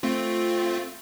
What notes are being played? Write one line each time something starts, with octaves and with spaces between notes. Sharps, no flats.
A3 C4 F4